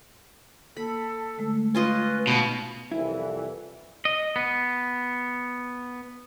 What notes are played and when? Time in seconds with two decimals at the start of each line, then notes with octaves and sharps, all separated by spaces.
0.77 A#3 A4 B5
1.38 D3 G#3 A3
1.75 C#4 F4 B4 D#5
2.27 B2 D#4 F5 B5
2.91 C2 F2 E3 E4
4.05 D#5
4.36 B3